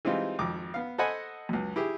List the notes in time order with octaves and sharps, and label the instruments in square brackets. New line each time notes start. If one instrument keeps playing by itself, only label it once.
[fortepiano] E3 G3 G#3 C4 D#4 F4
G#1 F2 D6
B3 F5
A4 C5 D#5 F#5 G#5 B5
C#2 F#2
E4 G4 G#4